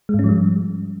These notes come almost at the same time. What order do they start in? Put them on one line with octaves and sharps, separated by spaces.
G#3 G#2 C#4 F3 G3